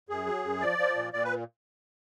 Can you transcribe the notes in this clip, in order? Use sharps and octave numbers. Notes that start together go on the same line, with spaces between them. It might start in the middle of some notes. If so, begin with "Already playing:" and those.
F#2 G#4
F#3
F#2
F3 D5
F3
A#2
A#2 D5
B4